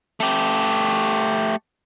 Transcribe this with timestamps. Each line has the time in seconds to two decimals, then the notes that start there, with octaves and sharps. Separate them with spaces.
0.20 A3 G4